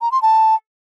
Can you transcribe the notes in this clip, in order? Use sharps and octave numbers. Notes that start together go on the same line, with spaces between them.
A#5
C6
A5